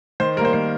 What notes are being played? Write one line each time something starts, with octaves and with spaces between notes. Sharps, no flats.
D#3 C5
G3 A#3 A#4 C5
D#3 C5